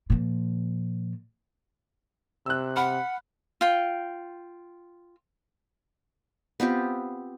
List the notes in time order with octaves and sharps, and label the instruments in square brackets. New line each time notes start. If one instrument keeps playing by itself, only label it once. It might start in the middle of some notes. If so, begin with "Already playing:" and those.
[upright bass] A#2 F3
[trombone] C3 [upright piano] E6 F#6
[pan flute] F#5 [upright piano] B5 F6
[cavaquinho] F4 G5
[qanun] B3 C4 F4 G4